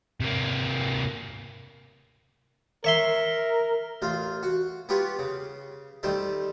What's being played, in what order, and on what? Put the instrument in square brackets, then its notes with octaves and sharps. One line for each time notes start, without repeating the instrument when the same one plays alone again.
[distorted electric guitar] C3 A#3
[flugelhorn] A#4 [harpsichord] C#5 E5 C6
[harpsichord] A1 F4 F5
F#4
B3 F4 G4 B4 C#5
C#3
D#3 G3 A3 C4